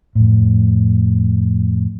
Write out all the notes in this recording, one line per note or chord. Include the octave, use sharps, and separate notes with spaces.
F2 A2